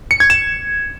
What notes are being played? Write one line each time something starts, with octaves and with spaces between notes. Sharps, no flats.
C#7
G#6
E7